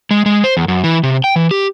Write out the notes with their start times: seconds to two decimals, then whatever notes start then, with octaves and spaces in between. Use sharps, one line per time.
0.11 G#3
0.26 G#3
0.44 C5
0.57 E2
0.68 F#2
0.84 E3
1.03 C3
1.24 G5
1.36 E3
1.51 G4